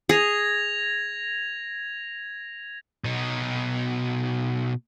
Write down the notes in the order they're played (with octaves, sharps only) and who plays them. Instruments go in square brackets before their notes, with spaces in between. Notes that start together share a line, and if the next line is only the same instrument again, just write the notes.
[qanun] G#4 [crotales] G#6 A#6 F7
[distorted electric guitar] B2 D#4